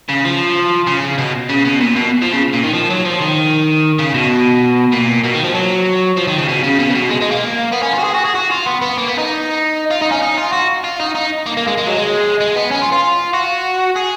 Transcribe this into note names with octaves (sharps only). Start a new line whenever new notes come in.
C#3
F3
C#3
B2
C#3
B2
A#2
B2
F3
C#3
A#2
D#3
F3
F#3
F3
D#3
C#3
B2
A#2
B2
D#3
F3
F#3
F3
D#3
C#3
B2
C#3
B2
C#3
B2
G#3
G#3
A#3
B3
C#4
F4
F#4
G#4
F#4
G#4
F#4
F4
B3
B3
A#3
B3
D#4
F4
D#4
C#4
D#4
F4
F#4
F4
D#4
D#4
A#3
A#3
G#3
G#3
F#3
G#3
G#3
B3
C#4
F4
F4
F#4
G#4